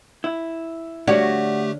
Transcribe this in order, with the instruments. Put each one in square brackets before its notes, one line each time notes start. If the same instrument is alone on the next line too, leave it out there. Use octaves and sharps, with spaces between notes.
[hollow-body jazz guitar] E4
[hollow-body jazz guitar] D3 C#5 F5 [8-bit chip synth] A3 G4 [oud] F#4 [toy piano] D5